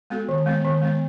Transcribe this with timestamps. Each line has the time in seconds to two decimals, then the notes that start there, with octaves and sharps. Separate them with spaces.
0.10 G#3 B3 F#4 A4
0.29 D#3
0.46 G#3 B3
0.65 D#3
0.81 G#3 B3